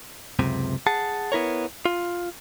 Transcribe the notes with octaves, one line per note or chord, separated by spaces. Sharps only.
C#2 F#2 C3
G#4 F#5 A5
B3 E4 A#4 C#5
F4